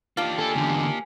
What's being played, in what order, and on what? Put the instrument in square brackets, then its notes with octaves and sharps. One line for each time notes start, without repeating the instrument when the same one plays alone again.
[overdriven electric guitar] A#3 G4 [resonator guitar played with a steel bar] D4 F4
[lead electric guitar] A4 [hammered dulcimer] G#5
[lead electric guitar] E2 D3